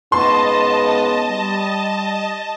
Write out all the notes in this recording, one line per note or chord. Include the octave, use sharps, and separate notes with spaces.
G#2 C#3 B3 D#5 A5 C6
G3